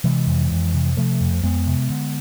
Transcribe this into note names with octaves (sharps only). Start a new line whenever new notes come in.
C3 E3 G#3
F2
F2
C3
C3 F3 A3
F2
F2 G#3 B3
C3
D3